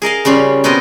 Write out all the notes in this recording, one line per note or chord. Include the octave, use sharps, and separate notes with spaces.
G#4 A#4 D#5 F5
C#3 G3 C#4 F4
B2 B3 C4 F#4 A#4 D#5